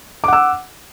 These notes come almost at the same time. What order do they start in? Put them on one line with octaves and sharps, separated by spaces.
D6 F#5 E6